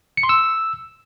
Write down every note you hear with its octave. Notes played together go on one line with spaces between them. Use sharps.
C#7
C6
E6